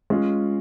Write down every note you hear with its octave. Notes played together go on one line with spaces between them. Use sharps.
G#3 C#4 F4